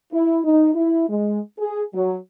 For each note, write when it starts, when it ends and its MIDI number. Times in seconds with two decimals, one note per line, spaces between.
0.13 0.39 64
0.45 0.71 63
0.75 1.09 64
1.10 1.40 56
1.59 1.83 68
1.94 2.16 54